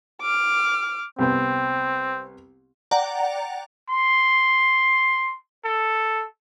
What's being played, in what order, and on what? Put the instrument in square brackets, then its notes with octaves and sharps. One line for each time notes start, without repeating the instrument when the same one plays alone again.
[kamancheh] D6 F6
[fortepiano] C2 B3 G5 [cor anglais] C4
[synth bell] D5 F#5 G5 A#5
[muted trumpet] C6
A4